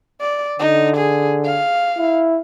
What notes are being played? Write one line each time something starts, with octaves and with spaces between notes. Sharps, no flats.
D5
D3 D#4
G#4
F5
E4